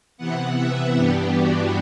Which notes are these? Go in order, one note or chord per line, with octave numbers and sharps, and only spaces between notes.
C3 E3 B3 F#5
E5
G2 E3 B3 D4 G4
F#4